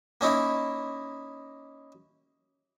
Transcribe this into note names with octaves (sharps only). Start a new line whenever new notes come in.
A#3 C#4 D#4 E4